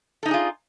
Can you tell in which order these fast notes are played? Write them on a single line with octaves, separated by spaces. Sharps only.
A4 D#4 D4 G#4 F4